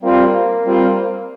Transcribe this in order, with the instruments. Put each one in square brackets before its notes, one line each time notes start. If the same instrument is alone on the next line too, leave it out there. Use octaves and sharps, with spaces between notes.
[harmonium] G3 C4 F4 [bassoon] A#3
[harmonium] G3 C4 F4